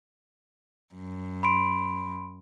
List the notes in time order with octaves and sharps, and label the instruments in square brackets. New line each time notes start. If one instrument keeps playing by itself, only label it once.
[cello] F#2
[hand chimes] B5 C6 D7